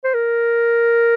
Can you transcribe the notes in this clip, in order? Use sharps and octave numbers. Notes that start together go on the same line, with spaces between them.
C5
A#4